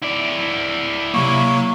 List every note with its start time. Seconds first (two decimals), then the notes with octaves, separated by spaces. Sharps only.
0.02 E4 D5
1.14 C3 F#3 A#3 C#6